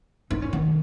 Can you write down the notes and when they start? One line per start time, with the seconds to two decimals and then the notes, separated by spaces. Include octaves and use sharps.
0.30 D#4
0.42 C#4
0.53 D#3